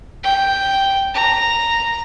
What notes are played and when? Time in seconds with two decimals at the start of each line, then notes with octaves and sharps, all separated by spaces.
0.23 G5
1.14 A#5